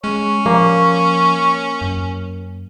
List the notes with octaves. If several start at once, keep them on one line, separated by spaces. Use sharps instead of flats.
G#3 C#4 C#5
F3 A#3
F#2